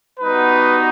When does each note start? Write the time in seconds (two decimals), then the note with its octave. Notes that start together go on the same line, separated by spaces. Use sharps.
0.20 G3 B3 D#4 F#4 B4